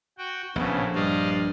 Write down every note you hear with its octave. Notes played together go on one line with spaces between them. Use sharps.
F#4 G5
A#1 A2 C#3 B3
G2 D5 D#5 F5